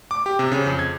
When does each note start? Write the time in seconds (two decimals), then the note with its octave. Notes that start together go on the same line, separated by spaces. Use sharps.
0.11 D6
0.26 G4
0.39 C3
0.52 C#3
0.66 F2
0.79 G#6